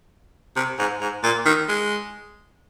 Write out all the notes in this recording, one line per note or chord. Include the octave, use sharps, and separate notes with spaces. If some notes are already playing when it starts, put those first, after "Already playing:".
C3
G#2
G#2
A#2
D#3
G#3